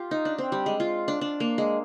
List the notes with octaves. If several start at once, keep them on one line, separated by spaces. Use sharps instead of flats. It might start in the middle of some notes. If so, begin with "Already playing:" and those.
Already playing: F4 G4
D#4
D4
C4
G3
G#3
F4
D4
D4
A#3
G#3